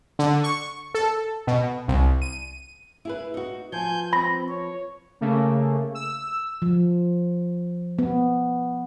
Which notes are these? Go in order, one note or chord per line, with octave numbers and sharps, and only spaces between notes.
D3
C#6
A4
B2
C2
D#7
E4 G#4 B4
D#4 F#4
F3 B3 G#5 G6
C4 B5 A#6
C#5
C#3 A3 A#3
E6
F3
B3